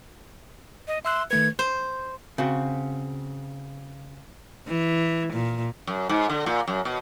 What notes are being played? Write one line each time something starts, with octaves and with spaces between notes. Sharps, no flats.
D#5
E5 C6 E6 F#6
D#3 A3 B4 G#6
C5
C#3 C4 F#4
E3
A#2
F#2
G#2
D3
A#2
F#2
B2